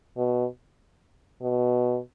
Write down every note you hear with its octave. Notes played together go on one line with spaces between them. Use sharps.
B2
B2